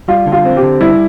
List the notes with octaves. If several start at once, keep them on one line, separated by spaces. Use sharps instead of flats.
G3 F4
D3
F4
C4
G4
D3
G3 E4